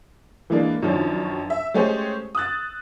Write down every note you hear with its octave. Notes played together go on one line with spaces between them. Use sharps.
E3 G#3 A#3 D4
F#2 D#3 F3 C#4 D4
E5
G#3 A3 C#4 G4 G#4 C5
D#6 E6 F#6 A6